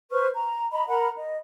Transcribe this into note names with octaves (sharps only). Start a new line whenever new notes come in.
B4 C5 C#6 F6
A#5
D#5 A#5 B5
A#4 F#5 A#5 B5
D#5